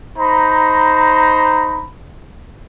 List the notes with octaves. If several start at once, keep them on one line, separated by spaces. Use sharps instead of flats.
D#4 C5 A#5 B5